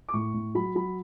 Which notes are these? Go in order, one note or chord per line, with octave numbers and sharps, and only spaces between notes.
D6
A2 C#6
A2
F#3 B5
F#3 B5